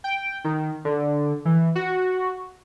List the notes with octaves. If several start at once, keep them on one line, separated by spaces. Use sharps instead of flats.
G5
D#3
D3
E3
F#4